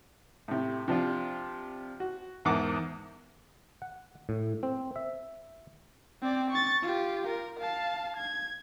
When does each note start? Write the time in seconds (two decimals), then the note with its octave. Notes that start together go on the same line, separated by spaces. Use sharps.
0.48 A2 C3
0.88 C3 F3 D4 F4
2.00 F#4
2.45 E2 G#2 A#4 F#5 A5 D6
3.82 F#5
4.29 A2
4.63 C4
4.96 E5
6.22 C4 D5
6.50 C#6 A6
6.83 F4 G4
7.27 A#4
7.60 F5 A5
8.17 G#6